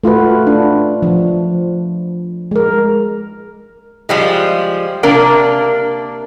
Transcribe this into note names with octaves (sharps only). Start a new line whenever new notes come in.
A3 F4 F#4 B4
D4
F3
G#3 A#4
F3 G3 G#3
C3 A#3 D4 A#4